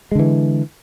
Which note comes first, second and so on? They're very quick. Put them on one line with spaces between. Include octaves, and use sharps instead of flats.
G#3 D3 E3